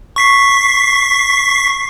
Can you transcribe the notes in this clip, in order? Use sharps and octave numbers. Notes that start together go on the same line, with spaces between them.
C#6 B6 C7